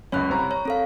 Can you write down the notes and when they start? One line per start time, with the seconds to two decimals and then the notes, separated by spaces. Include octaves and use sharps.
0.12 C#2 F#2 C#5 B5 F#6
0.30 C2 A#5
0.51 C#5 A#5
0.65 C4 A4 F5